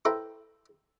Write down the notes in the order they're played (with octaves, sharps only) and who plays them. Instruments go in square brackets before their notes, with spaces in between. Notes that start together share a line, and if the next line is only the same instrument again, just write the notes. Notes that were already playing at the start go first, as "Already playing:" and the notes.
[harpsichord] E4 A4 B4 C5 G5 A#5